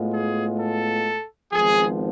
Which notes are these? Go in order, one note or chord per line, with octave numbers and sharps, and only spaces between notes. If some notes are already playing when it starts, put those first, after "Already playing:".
Already playing: A2 G#3 B3 F4
G#4
A4
G#1 G#2 F3 B3 G#4